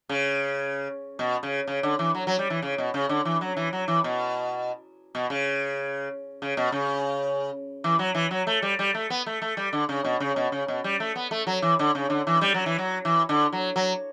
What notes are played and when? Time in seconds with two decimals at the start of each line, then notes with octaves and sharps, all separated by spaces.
0.09 C#3
1.19 B2
1.43 C#3
1.67 C#3
1.83 D3
1.99 E3
2.15 F#3
2.27 F#3
2.39 G3
2.50 E3
2.62 C#3
2.78 B2
2.94 C#3
3.09 D3
3.25 E3
3.41 F#3
3.57 E3
3.73 F#3
3.88 E3
4.04 B2
5.15 B2
5.30 C#3
6.42 C#3
6.57 B2
6.72 C#3
7.84 E3
7.99 F#3
8.15 E3
8.31 F#3
8.47 A3
8.62 G3
8.79 G3
8.95 A3
9.10 B3
9.26 A3
9.42 A3
9.57 G3
9.73 D3
9.89 C#3
10.04 B2
10.20 C#3
10.36 B2
10.52 C#3
10.68 B2
10.84 G3
11.00 A3
11.16 B3
11.31 A3
11.47 F#3
11.62 E3
11.79 D3
11.95 C#3
12.10 D3
12.27 E3
12.41 G3
12.54 F#3
12.66 E3
12.78 F#3
13.05 E3
13.29 D3
13.53 F#3
13.76 F#3